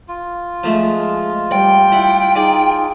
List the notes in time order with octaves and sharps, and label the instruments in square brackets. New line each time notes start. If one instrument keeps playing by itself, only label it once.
[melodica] F4
[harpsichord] F3 A3 [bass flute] G#3
[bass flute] G3 [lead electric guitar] G5
[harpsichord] E4 F#5
[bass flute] D#4 [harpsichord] G#4 D5